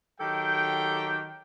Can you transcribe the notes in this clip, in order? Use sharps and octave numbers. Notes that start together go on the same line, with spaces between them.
D#3 F#3 G4 A4 G5